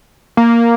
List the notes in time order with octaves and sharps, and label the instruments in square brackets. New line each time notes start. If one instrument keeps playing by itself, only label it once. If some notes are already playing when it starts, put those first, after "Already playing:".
[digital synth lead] A#3